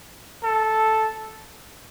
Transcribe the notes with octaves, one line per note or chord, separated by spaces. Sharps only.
A4